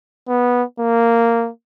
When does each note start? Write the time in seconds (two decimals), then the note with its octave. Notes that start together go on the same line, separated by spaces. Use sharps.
0.28 B3
0.80 A#3